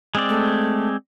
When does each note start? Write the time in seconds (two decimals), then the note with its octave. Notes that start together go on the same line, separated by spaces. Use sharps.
0.15 G#3 C4 D5
0.29 A3